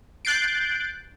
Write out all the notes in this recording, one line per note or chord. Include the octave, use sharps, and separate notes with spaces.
F#6 G6 A6 C7 D7